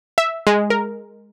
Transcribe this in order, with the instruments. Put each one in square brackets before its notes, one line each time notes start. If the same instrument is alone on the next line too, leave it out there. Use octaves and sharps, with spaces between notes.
[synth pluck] E5
G#3
A#4